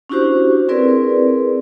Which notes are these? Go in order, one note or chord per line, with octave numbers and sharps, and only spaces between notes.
C#4 D4 E4 F#4 G4 C5
C4 E4 G#4 A#4 B4 D5